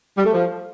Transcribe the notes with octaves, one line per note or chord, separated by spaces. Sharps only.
G3
A3
F3